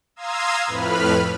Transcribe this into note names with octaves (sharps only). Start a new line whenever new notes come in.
F5 A#5 C6 D#6 E6 G#6
F2 A2 B4 B5 F6